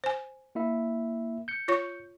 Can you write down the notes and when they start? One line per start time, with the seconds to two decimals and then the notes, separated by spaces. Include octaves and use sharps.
0.04 C5 G#5
0.55 A#3 E4 E5
1.48 G6 C#7
1.68 F4 C#5 C#6